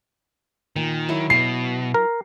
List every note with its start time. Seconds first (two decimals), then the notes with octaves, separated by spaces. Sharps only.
0.76 A#2 D#3
1.09 F#3 E4
1.30 B2 C7
1.94 A#4